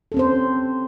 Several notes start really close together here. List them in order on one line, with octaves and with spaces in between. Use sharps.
A4 C#4 C4 C5